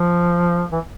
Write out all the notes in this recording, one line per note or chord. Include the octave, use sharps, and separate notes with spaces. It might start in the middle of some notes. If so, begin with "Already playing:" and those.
Already playing: F3
E3